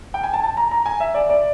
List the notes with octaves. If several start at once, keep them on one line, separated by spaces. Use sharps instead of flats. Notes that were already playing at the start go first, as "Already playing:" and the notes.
G5
G#5
A5
A5
A#5
A#5
G#5
E5
D5
D5